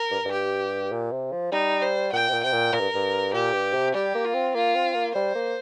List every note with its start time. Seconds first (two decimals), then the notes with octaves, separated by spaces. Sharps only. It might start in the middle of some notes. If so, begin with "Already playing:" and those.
Already playing: A#4
0.11 G2
0.25 G2
0.31 G4
0.91 A#2
1.12 C3
1.32 F3
1.52 G3 D#4
1.82 C5
2.13 A#2 G5
2.29 C3
2.33 A#2
2.43 C3 G5
2.53 A#2
2.73 A#2 A#4
2.80 G2
2.95 G2
3.34 A#2 G4
3.54 G2
3.74 C3
3.94 G3 G4
4.15 A#3
4.25 F4
4.34 C4
4.54 A#3 F4
4.75 C4
4.95 A#3
5.15 G3 C5
5.35 A#3